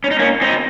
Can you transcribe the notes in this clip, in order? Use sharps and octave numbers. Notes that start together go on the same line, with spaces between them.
C#4
D#4
A#3 C#4
C4 D#4